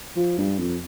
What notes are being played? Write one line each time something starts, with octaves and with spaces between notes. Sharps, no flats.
F3
G2
F2